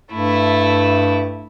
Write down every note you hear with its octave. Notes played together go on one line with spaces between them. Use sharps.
G2 A3 E4